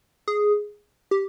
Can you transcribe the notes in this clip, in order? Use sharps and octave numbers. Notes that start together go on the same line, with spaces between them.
G#4
G4